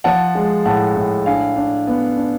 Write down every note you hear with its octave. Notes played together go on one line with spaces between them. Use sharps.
F3 F#5 A5
G#3
A2 F#5 A5
A2
D4 F5 G#5
D4
B3
D4